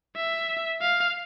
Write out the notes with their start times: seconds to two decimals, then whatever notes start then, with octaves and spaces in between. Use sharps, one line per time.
0.16 E5
0.81 F5